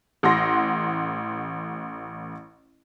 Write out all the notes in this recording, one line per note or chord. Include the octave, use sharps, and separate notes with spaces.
A1 F#5 C6 A#6